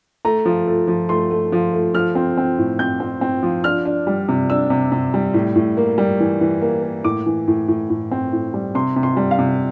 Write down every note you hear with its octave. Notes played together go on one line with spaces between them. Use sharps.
A3 A#5
F3
A3
F3
A3 C6
A3
F3
A3
F3 F6
C4
C4
A2
C4 G6
C4
C4
F3
D4 F6
D4
G3
C3
D4 E6
C3
C3
G3
A2
A2
A#3
G3
E3
E3
A#3
A#3
A2 D6
E3
A2
A2
A2
C4
A2
G3
C3 C6
C3
C6
G3
F5
C3